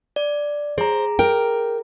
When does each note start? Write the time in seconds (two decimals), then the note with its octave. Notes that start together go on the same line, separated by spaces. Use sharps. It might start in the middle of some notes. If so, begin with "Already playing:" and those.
0.16 D5
0.78 G#4 C5 A#5
1.19 A#4 G5